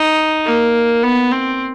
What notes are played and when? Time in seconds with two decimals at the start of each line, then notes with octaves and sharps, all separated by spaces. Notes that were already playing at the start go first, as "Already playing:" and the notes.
Already playing: D#4
0.46 A#3
1.04 B3
1.32 C4